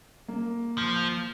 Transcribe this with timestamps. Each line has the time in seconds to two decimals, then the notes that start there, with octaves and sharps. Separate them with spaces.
0.28 A#3
0.78 F3